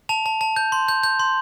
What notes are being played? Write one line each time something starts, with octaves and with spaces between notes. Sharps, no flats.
A5 F7
A5
A5
G6
C6
G6
G6
C6